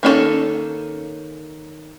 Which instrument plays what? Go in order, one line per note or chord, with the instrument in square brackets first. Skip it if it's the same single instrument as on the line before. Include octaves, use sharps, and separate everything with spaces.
[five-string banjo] D#3 A#3 C#4 E4 A4